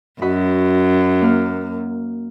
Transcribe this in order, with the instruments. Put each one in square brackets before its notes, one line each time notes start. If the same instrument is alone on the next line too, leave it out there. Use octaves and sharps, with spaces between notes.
[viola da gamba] F#2 [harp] F#4 D#5 B5
[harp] A#3 F6